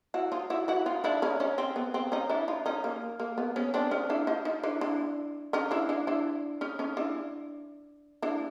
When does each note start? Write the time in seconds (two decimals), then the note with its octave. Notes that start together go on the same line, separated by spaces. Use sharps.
0.14 E4 F#4
0.32 D#4 F4
0.50 E4 F#4
0.68 E4 F#4
0.86 D#4 F4
1.04 D4 E4
1.22 C#4 D#4
1.40 C#4 D#4
1.58 C4
1.76 B3
1.94 C4
2.12 C#4 D#4
2.29 D4 E4
2.48 D#4 F4
2.66 C#4 D#4
2.84 A#3
3.20 A#3
3.38 B3
3.56 B3 C#4
3.74 C4 D4
3.91 C#4 D#4
4.10 D4 E4
4.27 D#4 F4
4.45 D#4 F4
4.63 D4 E4
4.81 D4 E4
5.53 C#4 D#4
5.71 D4 E4
5.89 D4 E4
6.07 D4 E4
6.61 C#4 D#4
6.79 C#4 D#4
6.97 D4 E4
8.22 D4 E4